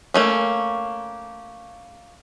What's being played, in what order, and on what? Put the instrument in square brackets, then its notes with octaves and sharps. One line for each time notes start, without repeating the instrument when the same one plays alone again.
[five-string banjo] A3 A#3 C#4